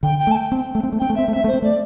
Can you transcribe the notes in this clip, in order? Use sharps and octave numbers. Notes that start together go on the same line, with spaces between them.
D3 G5
G5
A3
A5
G5
C4
A3
C4
A3
C4 G5
A3
C4 E5
A3
C4 E5
A3 C5
C4
A3 D5